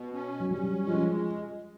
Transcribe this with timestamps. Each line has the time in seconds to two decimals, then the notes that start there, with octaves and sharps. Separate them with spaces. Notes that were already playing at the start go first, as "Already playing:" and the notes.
Already playing: B2
0.14 C#4
0.40 F#3
0.50 G3 C#4
0.87 F3 G#3